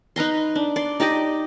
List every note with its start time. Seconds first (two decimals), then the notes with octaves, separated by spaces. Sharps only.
0.16 D#4 B4 A#5 C6
0.56 D4
0.76 D5 C6
1.00 D#4 G4 D5 D#5